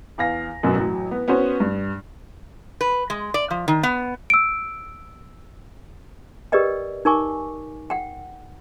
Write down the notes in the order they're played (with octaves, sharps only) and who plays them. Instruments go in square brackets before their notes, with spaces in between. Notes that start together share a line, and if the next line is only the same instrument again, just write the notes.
[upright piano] E2 F5 A#6
F#2 B2 F#3
A1 F#3
B3
B3 C#4 F#4 C5
G2
[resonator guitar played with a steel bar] B4
G#3
D5
F3
D#3
B3
[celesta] E6 D7
[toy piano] G4 A#4 B4 D5 D#5 G5
D#4 A#4 G#5 C#6 D6
F#5 G5